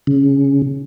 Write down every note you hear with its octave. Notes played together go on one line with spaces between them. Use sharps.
C#3